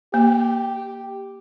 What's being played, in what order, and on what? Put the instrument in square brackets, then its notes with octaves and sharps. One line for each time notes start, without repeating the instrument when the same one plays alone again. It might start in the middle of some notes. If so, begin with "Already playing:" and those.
[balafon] A#3 [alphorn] G4